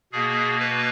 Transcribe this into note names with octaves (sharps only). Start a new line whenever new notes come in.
B2 A#3 G#4
B4